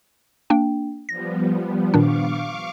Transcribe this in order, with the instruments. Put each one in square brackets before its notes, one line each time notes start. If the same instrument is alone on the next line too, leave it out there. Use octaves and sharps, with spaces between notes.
[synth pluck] A#3 D4 G5
[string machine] F3 G3 B3 [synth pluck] A#6
[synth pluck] A#2 D#3 D4 [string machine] F5 C#6 D6